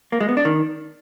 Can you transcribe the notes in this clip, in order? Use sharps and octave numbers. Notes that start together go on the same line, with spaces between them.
A#3
G#3
B3
D4
D#3